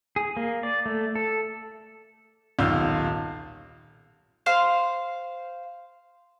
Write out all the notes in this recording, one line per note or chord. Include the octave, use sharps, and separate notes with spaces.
G#4
A#3
D5
A3
A4
D#1 B1 D#3 F4 E6 G6
C5 F5 C6